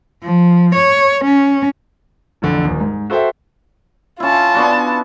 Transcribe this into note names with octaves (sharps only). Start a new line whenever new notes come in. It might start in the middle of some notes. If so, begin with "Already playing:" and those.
F3
C#5
C#4
A1 F2 D3
D#1 D#2
G#2
F#4 A4 C5 E5 G5
C#4 E4 F4 A5
B3 D4 F#4